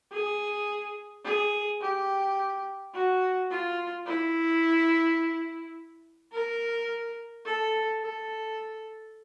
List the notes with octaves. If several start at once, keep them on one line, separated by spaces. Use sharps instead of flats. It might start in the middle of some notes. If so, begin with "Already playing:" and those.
G#4
G#4
G4
F#4
F4
E4
A#4
A4
A4